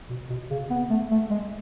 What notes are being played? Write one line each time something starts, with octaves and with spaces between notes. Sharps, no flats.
B2
B2
C#3
B3
A3
A3
G#3